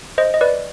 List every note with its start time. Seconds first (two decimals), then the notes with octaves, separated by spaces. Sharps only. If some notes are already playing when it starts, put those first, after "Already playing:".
0.18 C5 D#5
0.34 D#5
0.41 B4 D5